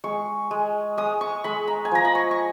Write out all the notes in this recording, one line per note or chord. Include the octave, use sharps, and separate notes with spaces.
G#3 C#6
G#3
G#3 D#6
C#6
G#3 B5
A#5
G#5
F3 A#5
B5
C#6
C#6